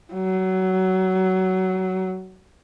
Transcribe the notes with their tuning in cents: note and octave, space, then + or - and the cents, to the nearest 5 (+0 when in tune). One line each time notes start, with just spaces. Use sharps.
F#3 +20